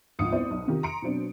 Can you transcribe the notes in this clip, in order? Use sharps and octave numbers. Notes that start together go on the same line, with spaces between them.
G#1 D2 F3 F4 D#6 C#7
B3 C4 E4 C5 D5
B1
C3 D#3 F4 G4 A#4
A#5 C6 C#7 D7
B2 F#3 C4 D4